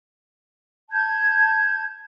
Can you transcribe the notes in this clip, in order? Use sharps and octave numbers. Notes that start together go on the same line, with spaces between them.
A5 G6 G#6